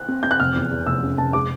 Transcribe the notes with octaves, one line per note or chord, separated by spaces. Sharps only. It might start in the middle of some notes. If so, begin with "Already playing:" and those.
Already playing: F#6
C4
C4 G6
F#6
F1 F6
E2
E2
F1 E6
C#3
F1 A5
G#3 D6